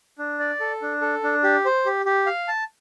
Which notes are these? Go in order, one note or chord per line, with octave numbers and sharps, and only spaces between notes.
D4
D5
A4
D4
A4
D4
G4
C5
G4
G4
F5
A5